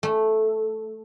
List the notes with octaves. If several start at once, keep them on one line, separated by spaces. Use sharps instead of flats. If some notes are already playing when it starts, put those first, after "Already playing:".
A3